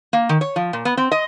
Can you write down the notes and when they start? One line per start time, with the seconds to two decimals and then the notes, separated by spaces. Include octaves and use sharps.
0.13 A#3
0.29 D#3
0.41 C#5
0.56 F3
0.73 A#2
0.85 B3
0.97 C4
1.12 D#5